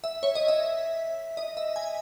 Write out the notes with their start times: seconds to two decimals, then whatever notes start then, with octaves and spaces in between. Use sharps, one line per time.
0.04 E5
0.23 C#5
0.35 D#5
0.48 E5
1.37 D#5
1.57 E5
1.76 G#5